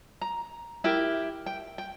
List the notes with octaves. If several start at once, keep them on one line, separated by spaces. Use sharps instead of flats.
A#5
E4 G4 A#4 G5
G5
G5